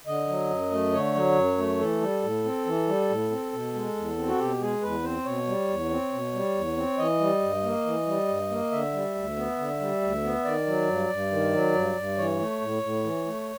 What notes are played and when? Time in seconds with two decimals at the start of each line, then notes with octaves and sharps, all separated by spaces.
0.07 D3 D#5
0.28 F#3
0.50 F#2
0.71 A3
0.93 D3 C#5
1.15 F#3
1.36 F#2
1.58 A3
1.80 E3 A4
2.01 G3
2.23 A2
2.44 C4
2.66 E3
2.88 G3
3.09 A2
3.31 C4
3.52 B2
3.74 G#3
3.96 E2
4.18 C4
4.28 F#4
4.39 B2 G4
4.60 G#3 G#4
4.82 E2 B4
5.04 C4 C5
5.25 B2 C#5
5.47 G3
5.69 E2
5.90 C4
6.12 B2
6.33 G3
6.55 E2
6.77 C4
6.98 E3 D#5
7.20 G3
7.42 G2
7.63 A#3
7.85 E3
8.07 G3
8.28 G2
8.50 A#3
8.71 D3 E5
8.93 G3
9.15 D2
9.37 B3
9.58 D3
9.80 G3
10.02 D2
10.23 B3
10.44 D#3 D5
10.66 F#3
10.88 G2
11.10 G2
11.31 D#3
11.53 F#3
11.75 G2
11.96 G2
12.18 E3 C#5
12.39 A3
12.61 A2
12.83 A2
13.04 E3
13.26 A3